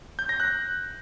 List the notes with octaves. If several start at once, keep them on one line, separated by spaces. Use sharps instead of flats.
G6
A#6
F#6